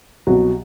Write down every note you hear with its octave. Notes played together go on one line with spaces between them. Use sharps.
C2 B2 F#3